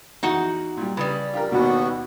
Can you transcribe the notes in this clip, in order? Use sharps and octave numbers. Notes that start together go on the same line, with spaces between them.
E2 D#4 F#4 F#5
A#2 G3
C#3 G3 B4 D#6
F4 G4 A#4
D#2 B2 B3 F#4